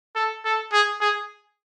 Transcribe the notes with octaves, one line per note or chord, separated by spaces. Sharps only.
A4
A4
G#4
G#4